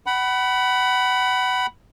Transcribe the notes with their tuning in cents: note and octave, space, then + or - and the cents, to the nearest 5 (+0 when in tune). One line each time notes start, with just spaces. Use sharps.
F#5 +30 B5 +0